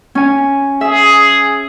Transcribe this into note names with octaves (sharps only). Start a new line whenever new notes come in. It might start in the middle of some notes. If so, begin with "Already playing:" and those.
C#4 G#5
G#4 E5